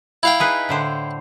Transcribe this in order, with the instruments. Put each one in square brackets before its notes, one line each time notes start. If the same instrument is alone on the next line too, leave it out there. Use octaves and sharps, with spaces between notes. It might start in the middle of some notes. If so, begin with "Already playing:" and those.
[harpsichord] E4 F5 G5
[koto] D#4 G#4 B4
A2 D3 C5